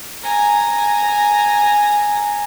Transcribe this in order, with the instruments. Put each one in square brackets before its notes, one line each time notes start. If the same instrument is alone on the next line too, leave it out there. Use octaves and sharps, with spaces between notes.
[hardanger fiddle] G#5 A#5